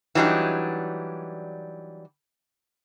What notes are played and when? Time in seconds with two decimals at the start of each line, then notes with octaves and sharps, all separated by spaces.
0.15 E3 F#3 G3 D4 D#4